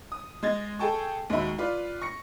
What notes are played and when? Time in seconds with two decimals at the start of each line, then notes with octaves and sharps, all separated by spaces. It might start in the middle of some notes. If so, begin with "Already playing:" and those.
0.12 D#6
0.43 G#3 D#5 G#6 A6
0.79 G#4 A4 G5 A5 C#6
1.30 D#2 G#3 D#4 F#4 E5 B5
1.58 F4 B4 D5
2.02 C#6 A#6 C#7